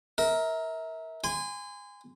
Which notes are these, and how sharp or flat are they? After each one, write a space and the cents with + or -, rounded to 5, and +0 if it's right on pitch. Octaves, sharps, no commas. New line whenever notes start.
A#4 +0 E5 -30
G#5 -25 C6 -35